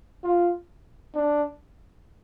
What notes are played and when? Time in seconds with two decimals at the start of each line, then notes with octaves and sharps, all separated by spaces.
0.24 F4
1.15 D4